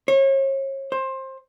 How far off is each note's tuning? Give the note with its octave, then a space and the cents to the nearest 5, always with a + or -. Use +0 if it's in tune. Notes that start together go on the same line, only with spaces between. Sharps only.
C#5 -35
C5 +20